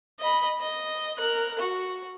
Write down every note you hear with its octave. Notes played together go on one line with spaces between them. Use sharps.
D#5 B5
D#5
A#4 F#6
F#4